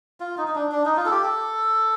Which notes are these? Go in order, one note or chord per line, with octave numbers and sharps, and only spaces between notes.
F4
D#4
D#4
D4
D4
D#4
F4
A4
G4
A4